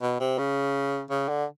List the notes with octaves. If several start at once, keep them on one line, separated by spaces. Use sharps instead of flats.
B2
C3
C#3
C#3
D3